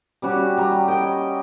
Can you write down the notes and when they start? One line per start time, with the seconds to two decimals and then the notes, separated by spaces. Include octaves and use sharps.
0.22 G3 C#4 F#4 G4
0.57 G3 A#5
0.88 C#5 D#5 G5